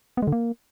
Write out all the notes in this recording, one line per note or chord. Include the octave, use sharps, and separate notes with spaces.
B3
G#3
D3
A#3